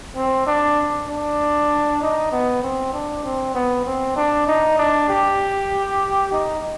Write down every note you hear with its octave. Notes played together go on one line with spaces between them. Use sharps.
C4
D4
D4
D#4
B3
C4
D4
C4
B3
C4
D4
D#4
D4
G4
D#4